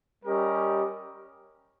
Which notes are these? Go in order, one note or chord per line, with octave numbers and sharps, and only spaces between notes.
G3 C#4 G4 A#4 D#5